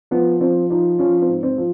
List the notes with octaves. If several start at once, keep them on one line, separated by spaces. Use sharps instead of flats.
F3 B3
F3 C4
F3 D#4
F3 C#4
C4
G#2
C4
F3